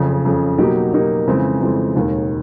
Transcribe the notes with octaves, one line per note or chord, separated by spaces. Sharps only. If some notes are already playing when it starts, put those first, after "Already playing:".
Already playing: F#1 F2 C#3
F#1 F2 C#3
B2 F#3 A#3 D#4 G4
B2 F#3 A#3 D#4 G4
F2 C#3 E3 G#3 C4
F2 C#3 E3 G#3 C4
E1 D#2 D#3